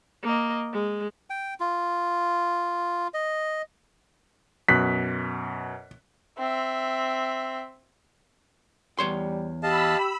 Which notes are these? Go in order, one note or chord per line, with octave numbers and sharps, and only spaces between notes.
A#3 D#5
G#3
G5
F4
D#5
F#2 B2 F#6 B6
C4 E5
E2 G3 C#5 C6
G4 D#5 F5 A5 B5 E6